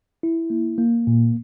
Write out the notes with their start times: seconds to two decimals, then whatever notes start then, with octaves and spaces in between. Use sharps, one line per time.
0.23 E4
0.50 A#3
0.78 A#3
1.07 A#2